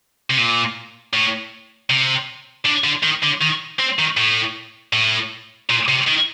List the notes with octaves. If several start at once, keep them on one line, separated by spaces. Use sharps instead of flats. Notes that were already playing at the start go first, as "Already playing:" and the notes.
C3
A#2
A2
C3
D3
D3
D#3
D3
D#3
C4
D#3
A2
A2
A#2
C3
D#3